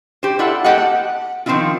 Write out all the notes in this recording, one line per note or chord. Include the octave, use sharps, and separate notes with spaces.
G4 C5
E4 F4 A4 D5 E5 F#5
A#3 G4 A4 D#5 F#5
F#5
D#3 F3 C4 D4 E4 F4